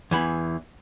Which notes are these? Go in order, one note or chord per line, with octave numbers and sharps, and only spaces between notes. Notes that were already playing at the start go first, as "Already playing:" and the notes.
E2 E3 B5